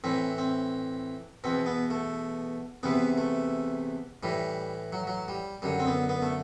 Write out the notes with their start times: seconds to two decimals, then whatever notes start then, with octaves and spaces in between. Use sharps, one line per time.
0.04 A2 E3 C4
0.38 C4
1.44 E2 B2 C4
1.66 B3
1.90 A3
2.83 E2 C3 E3 B3
3.18 A3
4.23 A2 E3 G3
4.93 F#3
5.07 F#3
5.28 G3
5.62 F#2 D3 G3
5.79 C4
5.86 B3
6.09 B3
6.22 A3